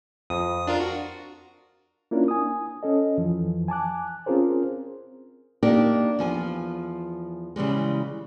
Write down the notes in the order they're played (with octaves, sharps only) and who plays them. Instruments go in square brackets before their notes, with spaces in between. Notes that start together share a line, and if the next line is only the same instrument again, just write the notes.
[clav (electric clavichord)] F2 [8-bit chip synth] D#6
[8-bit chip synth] D4 F4 A#4
F#4
[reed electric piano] A#3 C#4 D4 E4 F4 A#4
G#5 D#6
C#4 A4 D#5
F2 E3 F3
G#5 A5 D6 F#6
C4 C#4 F4 G#4 A#4 C5
[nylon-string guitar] A#3 D4 D#4 G4 A#4 D5
E2 F3 G#5
C#3 E3 G3 G#3